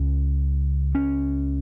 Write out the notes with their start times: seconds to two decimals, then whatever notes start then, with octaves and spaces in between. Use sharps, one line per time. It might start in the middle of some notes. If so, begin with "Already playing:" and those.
Already playing: C#2 C#3 C#4
0.95 C#4